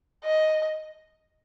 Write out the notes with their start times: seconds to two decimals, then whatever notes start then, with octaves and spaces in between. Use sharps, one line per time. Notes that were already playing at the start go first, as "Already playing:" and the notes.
0.24 D#5